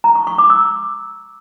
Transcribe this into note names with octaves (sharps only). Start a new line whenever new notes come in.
A#5
C#6
C#6
D6
E6